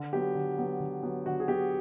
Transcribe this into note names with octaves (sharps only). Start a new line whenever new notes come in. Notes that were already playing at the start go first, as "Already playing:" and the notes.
Already playing: D3
F#3 B3 G4
D3
F#3 B3
D3
F#3 B3
D3 F#4
G#4
F#3 B3 G4